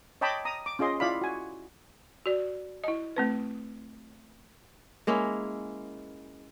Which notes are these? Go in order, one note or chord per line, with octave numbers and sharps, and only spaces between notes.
C#5 D#5 G5 A5 B5 D6
A#5 D#6
D6
C#4 F4 G#4 D#5 C6
E4 F4 D5 F5 B5
F#4 G#5
F#4 D5
E4 D#5
A3 C4 B4
G#3 A#3 C#4 E4